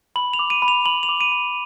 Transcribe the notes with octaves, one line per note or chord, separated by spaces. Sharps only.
B5 F#7
F7
D6
D#7
B5
F7
B5 F#7
F7
D6
D#7
B5